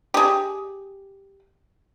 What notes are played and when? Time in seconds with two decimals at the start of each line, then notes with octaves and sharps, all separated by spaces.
0.14 G4 G#4